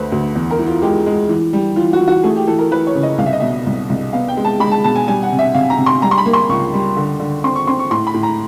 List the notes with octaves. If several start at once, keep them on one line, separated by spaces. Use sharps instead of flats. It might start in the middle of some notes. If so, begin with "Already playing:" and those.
Already playing: D2 A3 B4 C5
D2
E2
A#4
E3
F4
G#3 G4
G#3
E3
G3
E3 F4
F#4
E3
F#4
A3 G#4
G4
E3 A4
A#4
E3 B4
C#5
C#3
D#5
C2 F5
E5
D#5
B2 E5
C2
C2
B3 F5
G5
G#3
A5
G#3 B5
A5
B2 A5
G#5
G3 G#5
F#5
C3
E5
C3 F5
A#5
C3
C6
G3 A#5
C6
B5
A#3
C6
C#2 C#6
G3
D3
D3
C4 C6
C#6
C4 C6
C#6
A2 C6
B5
A2
A#5